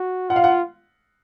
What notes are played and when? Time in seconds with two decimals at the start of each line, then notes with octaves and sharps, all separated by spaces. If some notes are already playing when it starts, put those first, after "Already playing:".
Already playing: F#4
0.29 F4 F#5
0.36 F5
0.44 F#5